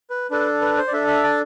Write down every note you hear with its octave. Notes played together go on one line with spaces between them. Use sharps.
B4
D4 A4 B4
B4
C5
D5
D4 A4 E5
E5
A5